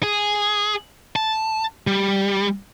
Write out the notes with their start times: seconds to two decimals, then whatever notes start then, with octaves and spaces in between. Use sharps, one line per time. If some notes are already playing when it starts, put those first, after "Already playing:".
0.03 G#4
1.16 A5
1.87 G3